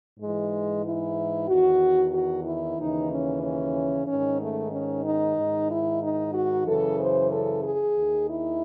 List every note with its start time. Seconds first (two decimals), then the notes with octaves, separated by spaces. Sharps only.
0.18 G#2 E3 G#3
0.84 E4
1.48 E2 D#3 F#4
2.13 F#4
2.45 E4
2.77 D#2 C#3 E3 D#4
3.09 C#4
3.43 C#4
4.07 G#2 D#3 C#4
4.40 A3
4.71 C#4
5.05 D#4
5.37 G#2 D#3
5.69 E4
6.01 D#4
6.33 F#4
6.65 F#2 C#3 E3 A4
6.99 C5
7.31 A4
7.63 G#4
7.96 D#2 D#3
8.28 E4